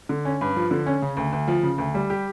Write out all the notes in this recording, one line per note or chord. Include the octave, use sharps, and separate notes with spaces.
D3
C#4
G2
F3
D3
C#4
C#3
D2
D2
F3
C#3
D2
G3
G4